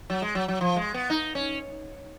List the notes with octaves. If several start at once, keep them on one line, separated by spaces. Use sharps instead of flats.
F#3
G#3
F#3
F#3
F3
G#3
B3
D#4
C#4